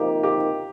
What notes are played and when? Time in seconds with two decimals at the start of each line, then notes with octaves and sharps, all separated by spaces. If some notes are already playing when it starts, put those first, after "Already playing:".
Already playing: C3 F3 A#3 D#4 G4
0.23 G4